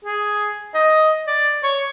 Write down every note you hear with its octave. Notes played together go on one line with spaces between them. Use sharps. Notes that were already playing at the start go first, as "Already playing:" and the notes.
G#4
D#5
D5
C#5